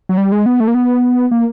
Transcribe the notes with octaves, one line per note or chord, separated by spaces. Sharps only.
F#3
G3
G#3
B3
A3
A#3
B3
A#3